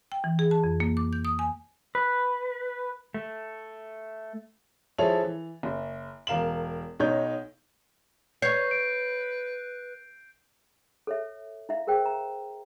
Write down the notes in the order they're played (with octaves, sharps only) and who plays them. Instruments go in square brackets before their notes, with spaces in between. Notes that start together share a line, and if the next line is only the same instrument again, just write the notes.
[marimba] G5
E3
G#4
A5
F2
A#3
D6
G6
D#6
G#5
[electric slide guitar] B4
A3
[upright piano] F3 E4 G#4 A4 C#5 F7
E3
F#1
E1 A#4 F5 E7 F#7
B1 D#4 C#5 G6
[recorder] B4 [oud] C#5 [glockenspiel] G6 C7
[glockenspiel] D7
[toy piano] A4 C#5 E5
E4 E5 F5
G#4 A#4 C5 G5
A#5